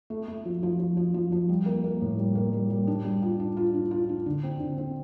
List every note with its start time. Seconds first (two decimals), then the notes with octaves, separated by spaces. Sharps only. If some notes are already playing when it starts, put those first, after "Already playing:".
0.10 A3
0.28 A3
0.45 F3
0.63 F3
0.80 F3
0.97 F3
1.14 F3
1.32 F3
1.49 G3
1.66 A#3
1.84 A#3
2.01 A2
2.18 G3
2.35 A#3
2.53 G3
2.70 G3
2.87 D4
3.05 G3
3.22 F4
3.40 D4
3.57 F4
3.74 D4
3.91 F4
4.09 D4
4.26 D3
4.44 C4
4.60 D3
4.78 C4